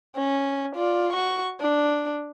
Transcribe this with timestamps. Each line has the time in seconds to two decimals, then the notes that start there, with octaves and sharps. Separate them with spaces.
0.16 C#4
0.76 F4 D5
1.13 F#4 C#6
1.61 D4